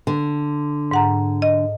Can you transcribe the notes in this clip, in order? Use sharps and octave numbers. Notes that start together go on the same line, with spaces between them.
D3
G#2 F#5 A#5
D#5